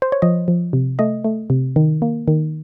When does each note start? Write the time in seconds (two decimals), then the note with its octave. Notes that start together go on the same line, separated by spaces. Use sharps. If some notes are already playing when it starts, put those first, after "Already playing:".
0.02 C5
0.12 C#5
0.22 F3 D#5
0.48 F3
0.73 C3
0.99 A3 D#5
1.25 A3
1.50 C3
1.76 D#3
2.02 A#3
2.28 D#3